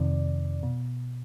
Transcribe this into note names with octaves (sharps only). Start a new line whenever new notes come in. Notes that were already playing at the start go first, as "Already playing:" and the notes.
Already playing: F2 C3 D#3 D5
B2